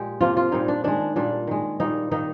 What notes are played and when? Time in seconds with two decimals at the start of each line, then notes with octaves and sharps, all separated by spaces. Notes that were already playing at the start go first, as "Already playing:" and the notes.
Already playing: A#2 G#3 G4
0.20 C3 F3 A#3 F4
0.37 F4
0.52 A#2 G3 A#3 D#4
0.68 D4
0.84 D#3 G#3 D4
1.16 A#2 G3 A#3 D4
1.47 D#3 G#3
1.80 A#2 G3 A#3 D#4
2.11 D#3 A#3 D#4